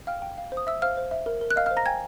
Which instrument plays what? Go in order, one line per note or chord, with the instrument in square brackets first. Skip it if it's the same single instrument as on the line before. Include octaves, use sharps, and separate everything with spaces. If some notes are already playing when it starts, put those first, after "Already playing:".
[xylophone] F5 G5 F6
G5
F5
C5
D#6
E5 E6
C5 F5 F6
C5
E5
A#4
A#4
F#6
D#5 F5 F6
F5 F6
C5
A#5 A#6
G5 G#5 G#6